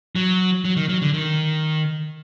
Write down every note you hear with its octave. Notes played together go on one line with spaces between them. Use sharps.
F#3
F#3
D#3
F#3
D3
D#3